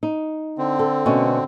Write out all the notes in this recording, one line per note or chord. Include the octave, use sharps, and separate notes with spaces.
D#4
D3 C4
A4
B2 A3 C#4